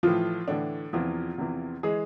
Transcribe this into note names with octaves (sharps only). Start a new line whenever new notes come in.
A2 E3 F3 F4
A2 D3 E3 D4
E2 C3 E3 F3 F4
E2 C3 E3
E3 G#3 G#4